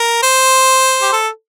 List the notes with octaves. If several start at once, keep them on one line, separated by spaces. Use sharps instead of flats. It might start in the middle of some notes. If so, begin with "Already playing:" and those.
Already playing: A#4
C5
G4
A4